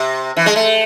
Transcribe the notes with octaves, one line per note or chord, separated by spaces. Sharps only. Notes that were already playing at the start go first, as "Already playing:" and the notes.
Already playing: C3
E3
G#3
A3